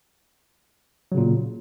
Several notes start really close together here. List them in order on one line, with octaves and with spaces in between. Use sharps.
F#3 C#3 A#2